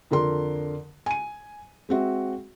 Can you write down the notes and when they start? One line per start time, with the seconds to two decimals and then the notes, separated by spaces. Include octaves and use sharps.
0.11 F2 D3 A#4 C6
1.06 G#5 D#7
1.89 G#3 C4 F#4 E5